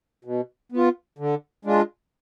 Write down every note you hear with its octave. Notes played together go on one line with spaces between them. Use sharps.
B2
B3 F4
D3
G#3 D4 F4